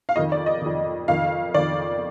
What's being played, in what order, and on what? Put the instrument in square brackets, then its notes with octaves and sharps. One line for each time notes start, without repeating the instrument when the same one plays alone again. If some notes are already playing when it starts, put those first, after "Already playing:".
[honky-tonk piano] F5
F2 D#3 D#5
D5
D#5
F2 D#3
F2 D#3 F5
F2 D#3 D5